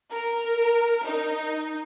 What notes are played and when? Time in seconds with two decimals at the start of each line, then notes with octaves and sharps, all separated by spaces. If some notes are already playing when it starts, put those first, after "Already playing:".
0.12 A#4
1.06 D#4